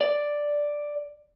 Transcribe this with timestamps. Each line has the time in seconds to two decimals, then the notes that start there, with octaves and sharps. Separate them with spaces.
0.01 D5